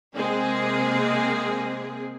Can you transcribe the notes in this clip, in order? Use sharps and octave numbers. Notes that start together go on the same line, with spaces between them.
C3 G#3 A#3 C4 G#4